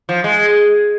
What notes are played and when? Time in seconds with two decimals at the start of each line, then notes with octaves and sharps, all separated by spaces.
0.09 F3
0.24 G#3